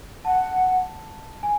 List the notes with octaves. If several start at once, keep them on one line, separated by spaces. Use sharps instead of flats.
F#5 A5
G#5